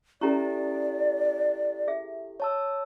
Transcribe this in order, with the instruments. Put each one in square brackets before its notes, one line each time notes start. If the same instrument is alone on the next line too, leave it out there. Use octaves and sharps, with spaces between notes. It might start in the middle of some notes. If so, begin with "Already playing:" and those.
[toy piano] C#4 A#5 C#6 [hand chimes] E4 G4 A4 [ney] D5
[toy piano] G#4 E5
[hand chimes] C#5 A5 E6